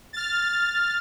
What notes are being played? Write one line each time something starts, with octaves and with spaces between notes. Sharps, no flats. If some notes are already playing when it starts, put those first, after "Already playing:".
F6 A6